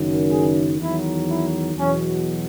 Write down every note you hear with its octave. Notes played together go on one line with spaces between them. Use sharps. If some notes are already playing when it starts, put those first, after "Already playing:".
Already playing: F#1 F#2 D#3
G#4
E2 D#3 F#3 E4
E4
E2 B2 F#3 C#4